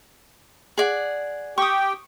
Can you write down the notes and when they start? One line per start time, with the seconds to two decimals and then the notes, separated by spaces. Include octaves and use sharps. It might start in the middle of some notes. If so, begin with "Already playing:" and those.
0.78 G#4 D5 F#5
1.58 G4 G5 C#6 D#6